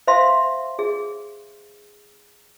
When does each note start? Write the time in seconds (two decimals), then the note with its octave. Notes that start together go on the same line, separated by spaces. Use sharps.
0.07 C5 E5 F5 C6
0.79 G#4